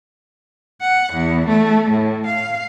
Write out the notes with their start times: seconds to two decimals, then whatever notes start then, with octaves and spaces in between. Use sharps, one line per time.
0.82 F#5
1.13 E2
1.48 A3
1.90 A2
2.26 F5